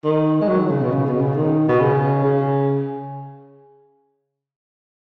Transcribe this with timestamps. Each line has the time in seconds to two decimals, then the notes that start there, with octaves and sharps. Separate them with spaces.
0.04 D#3
0.41 G#3
0.48 F#3
0.60 D#3
0.69 C#3
0.82 B2
0.92 C#3
1.06 B2
1.21 C#3
1.35 D#3
1.68 B2
1.80 C#3
2.23 C#3